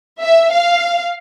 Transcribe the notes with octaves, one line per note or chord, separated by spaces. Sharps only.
E5
F5